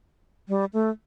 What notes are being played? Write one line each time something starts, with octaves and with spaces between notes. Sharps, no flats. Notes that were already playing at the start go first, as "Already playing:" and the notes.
G3
A3